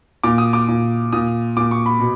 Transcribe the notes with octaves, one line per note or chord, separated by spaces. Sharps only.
A#2 D6
D#6
D6
A#2
A#2 D#6
A#2 D6
C#6
B5
B2